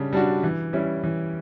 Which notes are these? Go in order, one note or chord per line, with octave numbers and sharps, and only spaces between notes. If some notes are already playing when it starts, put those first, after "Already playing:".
Already playing: C#3 G3 D4
G3 D4 F#4
E3
G3 C#4 E4
E3